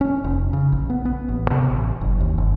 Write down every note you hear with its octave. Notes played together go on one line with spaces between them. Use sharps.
C#4
F1
C#3
A#1
B3
B3
A1
C3
A1
F#1
D#2
G1